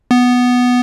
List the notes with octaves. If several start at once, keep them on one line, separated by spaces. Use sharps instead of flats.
B3